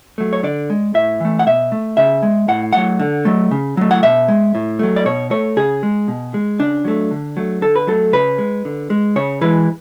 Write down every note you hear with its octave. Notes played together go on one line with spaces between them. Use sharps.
F#3 A3
C#5
D3 D5
G#3
A2 E5
E3 A3
F#5
B2 E5
A3
C#3 E5
G#3
A2 F#5
F#3 A3 F#5
D3
F#3 A3
C#3
F#3 A3
F#5
B2 E5
G#3
A2
F#3 A3
D5
B2 C#5
A3 C#5
C#3 G#4
G#3
B2
G#3
C#3 D4
F#3 A3
D3
F#3 A3
D3 A4
B4
F#3 A3 A4
C#3 B4
G#3
D3
G#3
C#3 C#5
E3 G#3 B4